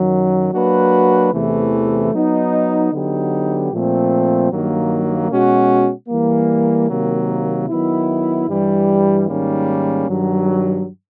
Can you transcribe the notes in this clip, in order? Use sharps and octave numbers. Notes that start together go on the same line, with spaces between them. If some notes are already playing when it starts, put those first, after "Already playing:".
Already playing: F#2 D#3 F#3
F#3 A#3 D4 F#4 B4
E2 C3 E3 A3
F#3 B3 D#4
D3 F#3 B3 D#4 G4
A#2 F3 A3 C4
G2 D#3 F#3 A#3
B2 G#3 C#4 F#4
E3 G3 A#3
C3 D#3 F#3 A#3
D#3 F#3 B3 E4
G2 E3 G3
G#2 D#3 G3 A#3 C#4
G2 D#3 F#3